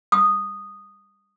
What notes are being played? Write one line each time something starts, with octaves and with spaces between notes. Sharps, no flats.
D#6